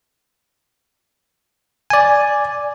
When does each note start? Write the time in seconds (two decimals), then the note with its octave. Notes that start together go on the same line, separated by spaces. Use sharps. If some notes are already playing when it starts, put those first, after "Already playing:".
1.90 D5 G#5